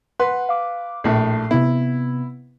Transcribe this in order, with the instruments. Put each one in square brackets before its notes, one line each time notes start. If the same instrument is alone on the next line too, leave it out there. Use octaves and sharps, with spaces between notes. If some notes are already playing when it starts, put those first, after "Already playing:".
[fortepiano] B4 C6 [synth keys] F#5
[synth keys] F5 D6
[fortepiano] A#1 A2 [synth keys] C7
[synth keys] C3 B3 [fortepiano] E4